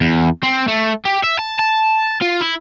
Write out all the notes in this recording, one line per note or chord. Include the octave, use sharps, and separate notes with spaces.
E2
C4
A3
G4
E5
A5
A5
F4
E4